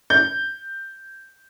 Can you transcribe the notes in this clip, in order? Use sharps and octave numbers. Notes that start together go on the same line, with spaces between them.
G6